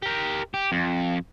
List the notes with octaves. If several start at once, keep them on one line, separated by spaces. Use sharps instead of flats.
G4 A#4
G4
F2